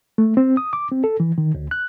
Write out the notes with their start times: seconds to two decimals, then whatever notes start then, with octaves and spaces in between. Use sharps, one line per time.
0.18 A3
0.37 C4
0.57 D#6
0.73 D6
0.91 C4
1.04 A4
1.20 E3
1.38 D#3
1.55 D2
1.71 F#6